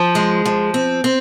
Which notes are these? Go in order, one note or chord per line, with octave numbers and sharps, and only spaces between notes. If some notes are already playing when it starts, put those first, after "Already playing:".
Already playing: F3
G#3
F3
C4
C4